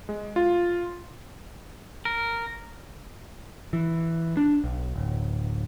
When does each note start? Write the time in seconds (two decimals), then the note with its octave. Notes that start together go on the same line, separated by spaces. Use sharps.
0.09 G#3
0.36 F4
2.05 A#4
3.73 E3
4.37 D4
4.64 B1
4.96 D1